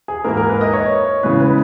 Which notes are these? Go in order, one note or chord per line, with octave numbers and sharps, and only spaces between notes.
G#4
G#2 E3 A#3 E4 A#4
A#4
B4
D#5
C#5
C#3 E3 G#3 B3 B4
B4